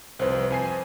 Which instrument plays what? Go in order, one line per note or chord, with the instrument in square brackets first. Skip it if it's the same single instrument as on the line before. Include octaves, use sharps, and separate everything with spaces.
[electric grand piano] C2 F2 [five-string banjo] B4 C5
[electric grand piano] F2 G#5 C7